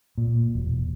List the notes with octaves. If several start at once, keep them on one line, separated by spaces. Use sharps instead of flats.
A#2
E1